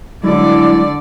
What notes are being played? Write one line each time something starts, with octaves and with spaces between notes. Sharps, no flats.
D3 F#3 G#3 E4 D5